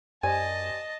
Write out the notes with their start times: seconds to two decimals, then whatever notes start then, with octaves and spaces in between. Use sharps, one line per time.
0.23 F#2 G4 C5 D5 D#5 G#5 A5